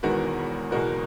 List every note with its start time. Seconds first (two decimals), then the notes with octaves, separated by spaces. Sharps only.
0.03 E1 E2 D#3 G#3 B3 F#4 A#4
0.71 F#1 E2 B2 G#3 F#4 A#4